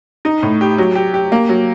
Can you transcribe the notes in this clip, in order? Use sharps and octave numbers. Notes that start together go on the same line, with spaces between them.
D#4
A2
G4
F#3
G4
G4
A#3
F#3